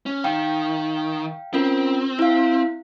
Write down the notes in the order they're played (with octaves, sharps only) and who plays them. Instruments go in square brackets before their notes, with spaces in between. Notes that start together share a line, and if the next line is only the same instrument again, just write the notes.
[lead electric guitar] C#4
[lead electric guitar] D#3 [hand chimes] F5 G5
[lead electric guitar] C4 [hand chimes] C#4 F4 A#4
[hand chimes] E4 F5